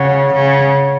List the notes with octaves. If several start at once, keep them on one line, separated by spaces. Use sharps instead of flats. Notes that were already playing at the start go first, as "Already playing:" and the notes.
Already playing: C#3 C#5 F#5
C#3